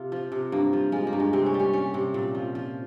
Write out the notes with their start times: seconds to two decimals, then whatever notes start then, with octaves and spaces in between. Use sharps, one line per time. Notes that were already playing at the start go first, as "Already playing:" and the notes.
Already playing: C3 F4
0.12 F3
0.32 C3
0.52 G2 A#3
0.73 F3
0.92 F3 G#3
1.07 A#3
1.13 G2
1.20 G#3
1.33 C3 C4
1.46 C#4
1.54 G3
1.60 C#4
1.73 G3 C#4
1.94 C3
2.14 A#2
2.35 F3
2.55 F3